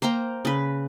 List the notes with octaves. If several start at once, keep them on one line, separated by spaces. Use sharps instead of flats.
A#3 C5 G5 A#5
C#3 B4